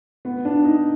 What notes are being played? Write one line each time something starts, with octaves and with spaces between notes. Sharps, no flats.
B3
D4
D#4